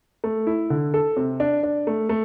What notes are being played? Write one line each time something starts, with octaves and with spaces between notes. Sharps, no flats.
A3
E4
D3
A4
C3
D4
D4
A3
A3